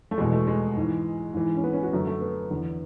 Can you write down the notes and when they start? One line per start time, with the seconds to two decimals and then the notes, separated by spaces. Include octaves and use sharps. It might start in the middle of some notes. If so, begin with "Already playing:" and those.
0.11 A3
0.18 E2 B2 G#3
0.32 A3
0.47 G#3
0.76 G#2 E3
1.34 G#2 E3
1.57 C#4
1.64 B3
1.73 C#4
1.83 F#4
1.93 F#2 D3 A3
2.07 A3
2.21 B3
2.50 E2 D3